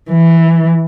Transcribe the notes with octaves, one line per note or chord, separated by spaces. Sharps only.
E3